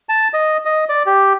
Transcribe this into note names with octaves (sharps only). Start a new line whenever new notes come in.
A5
D#5
D#5
D5
G4